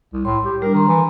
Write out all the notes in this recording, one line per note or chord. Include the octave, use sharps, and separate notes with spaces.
C2
A2 C6
G4
G3 D4 A#4
D#3 A#5 C6
E3